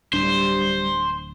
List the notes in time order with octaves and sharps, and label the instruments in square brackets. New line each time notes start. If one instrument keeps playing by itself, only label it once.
[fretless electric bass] D1 D4 [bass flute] G3 [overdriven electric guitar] C5